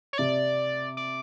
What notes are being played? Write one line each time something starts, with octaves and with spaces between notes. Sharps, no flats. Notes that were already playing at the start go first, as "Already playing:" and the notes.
C#5
C3 D5
D5